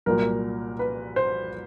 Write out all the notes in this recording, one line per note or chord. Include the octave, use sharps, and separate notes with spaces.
C2 A#2 F#3 A#4
B4
C5